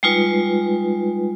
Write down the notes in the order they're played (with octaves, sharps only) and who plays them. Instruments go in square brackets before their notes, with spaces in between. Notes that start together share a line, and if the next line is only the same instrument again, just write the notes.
[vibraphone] G3 G#3 D#4 F4 B4